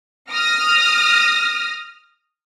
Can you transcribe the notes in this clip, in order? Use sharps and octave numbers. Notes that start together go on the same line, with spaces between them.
D#6 F6 A#6